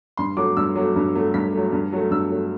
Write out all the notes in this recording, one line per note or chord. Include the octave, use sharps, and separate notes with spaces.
G2 C6
F#3 A3 D6
G2 E6
F#3 A3
G2
F#3 A3
G2 B6
F#3 A3
G2
F#3 A3
G2 E6
F#3 A3